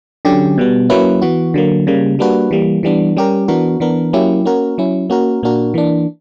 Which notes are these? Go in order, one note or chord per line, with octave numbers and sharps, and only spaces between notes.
D3 F#3 C#4 G4
B2 G3 B3
F#3 A#3 C#4 E4 B4
E3 B3 F#4
D3 F#3 A#3
C#3 G3 A#3
G3 A#3 D4 F#4 B4
E3 G3 A#3
E3 G3 B3 D4
G3 C#4 G4 A#4
E3 B3 D4 F#4 A#4
E3 B3 D4 A#4
F#3 A#3 C#4 E4 G4
A#3 C#4 F#4 A#4
F#3 C#4 E4
A#3 C#4 F#4 A#4
A#2 A#3 D4 F#4 A#4
E3 A#3 D4